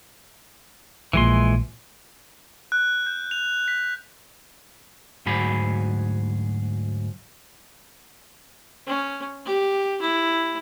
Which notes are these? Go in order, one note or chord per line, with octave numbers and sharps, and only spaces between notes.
A#1 A#2 E3 G#3 C6
F#6
G6
F7
B6
D2 G#2 F#3 G#4 B5
C#4
G4
E4